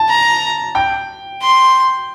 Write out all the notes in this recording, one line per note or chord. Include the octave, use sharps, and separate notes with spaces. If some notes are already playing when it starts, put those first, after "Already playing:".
Already playing: A5
A#5
G5
C6